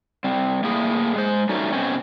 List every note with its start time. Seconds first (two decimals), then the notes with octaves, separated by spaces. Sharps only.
0.24 G3 C4
0.63 A2 A#3 E4 G#4
1.16 G#3 C5
1.49 G3 A3 C#4 D#4 F#4
1.73 B2 C4 C#4